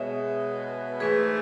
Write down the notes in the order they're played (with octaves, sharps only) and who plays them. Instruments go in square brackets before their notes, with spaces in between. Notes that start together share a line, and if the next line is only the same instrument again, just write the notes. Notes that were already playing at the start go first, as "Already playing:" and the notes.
Already playing: [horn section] B2 G#3 B3 [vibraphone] C#5 E5
[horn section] G#2 E3 A3 [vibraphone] G#4 B4